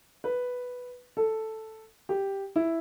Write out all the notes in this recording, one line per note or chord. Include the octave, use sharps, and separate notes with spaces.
B4
A4
G4
E4